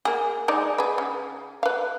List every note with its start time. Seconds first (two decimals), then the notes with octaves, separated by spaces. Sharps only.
0.05 A#3 G#4
0.48 G#3 D#4 D5
0.78 G#4 B4
0.98 C#3
1.63 B4 F5